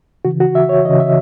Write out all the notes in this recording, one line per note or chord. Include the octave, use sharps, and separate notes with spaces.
C#3 E3 F#4
F#4
E5
C#5
C#3 E3 D#5
E5